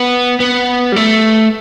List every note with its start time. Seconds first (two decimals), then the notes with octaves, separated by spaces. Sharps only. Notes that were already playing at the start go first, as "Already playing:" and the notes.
Already playing: B3
0.40 B3
0.92 G3
0.96 A3